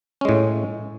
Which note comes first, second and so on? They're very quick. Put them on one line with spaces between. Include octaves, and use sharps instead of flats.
C#4 G#3 A2